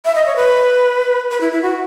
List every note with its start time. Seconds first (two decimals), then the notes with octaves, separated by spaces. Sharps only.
0.05 E5
0.15 D#5
0.26 C#5
0.36 B4
1.31 B4
1.41 E4
1.52 E4
1.62 F#4